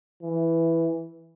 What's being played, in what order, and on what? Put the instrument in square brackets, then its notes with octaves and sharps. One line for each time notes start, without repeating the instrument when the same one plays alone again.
[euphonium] E3